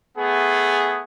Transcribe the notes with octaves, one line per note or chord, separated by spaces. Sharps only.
A3 B3 G#4